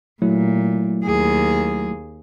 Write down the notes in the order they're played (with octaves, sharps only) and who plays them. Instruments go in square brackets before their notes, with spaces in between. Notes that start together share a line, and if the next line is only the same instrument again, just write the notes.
[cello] A#2 [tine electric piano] F#3 A3 E4
[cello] D#2 G#4